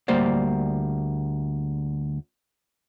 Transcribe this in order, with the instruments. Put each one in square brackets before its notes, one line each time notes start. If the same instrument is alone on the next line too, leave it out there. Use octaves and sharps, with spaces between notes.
[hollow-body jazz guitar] D2 G3 A#3 C5 D5